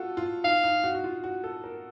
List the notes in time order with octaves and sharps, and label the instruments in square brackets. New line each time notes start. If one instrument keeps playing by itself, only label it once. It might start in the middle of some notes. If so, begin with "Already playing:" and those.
Already playing: [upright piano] F4 F#4 A4
F4
[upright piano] D#4 [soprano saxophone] F5
[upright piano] D#4
F#4
F#4
F4
F#4
A4
A#4